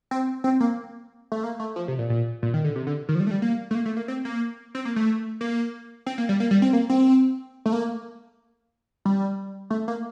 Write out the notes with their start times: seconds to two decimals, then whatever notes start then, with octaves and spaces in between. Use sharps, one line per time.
0.11 C4
0.44 C4
0.60 A#3
1.32 A3
1.43 A#3
1.60 A3
1.76 F3
1.88 C3
1.98 A#2
2.10 A#2
2.43 A#2
2.54 D#3
2.64 D3
2.76 C3
2.87 D3
3.09 D#3
3.15 F3
3.20 G3
3.27 A3
3.31 G3
3.42 A#3
3.71 A3
3.75 A#3
3.86 A3
3.97 A#3
4.08 C4
4.25 A#3
4.75 C4
4.85 A#3
4.96 A3
5.41 A#3
6.06 C4
6.18 A#3
6.29 G3
6.40 A#3
6.51 G3
6.62 C4
6.73 A#3
6.90 C4
7.66 A3
7.72 A#3
9.05 G3
9.70 A3
9.88 A#3